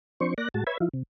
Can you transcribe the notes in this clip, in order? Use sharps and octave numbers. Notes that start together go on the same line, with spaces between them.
F3 C4 D4 C5 C#6
A#3 D5 F#6 A#6
A2 G#3 F#4 A5
B4 C#5 E5 B5 G#6
F3 E4 F4
C3